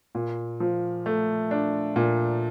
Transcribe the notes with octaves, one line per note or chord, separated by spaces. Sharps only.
A#2
F3
A3
D4
A#2